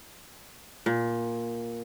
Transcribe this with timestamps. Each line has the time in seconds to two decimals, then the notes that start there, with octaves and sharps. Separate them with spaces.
0.86 A#2